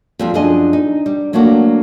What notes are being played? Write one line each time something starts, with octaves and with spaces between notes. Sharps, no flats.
F2 G3 C4
F#2 F3 D4 G#4 D#5
D#4
G3
F#3 A3 A#3 D4 F#4